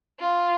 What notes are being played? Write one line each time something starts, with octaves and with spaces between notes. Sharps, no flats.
F4